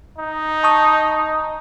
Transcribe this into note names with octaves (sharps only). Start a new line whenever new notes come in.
D#4
A5 C#6 D#6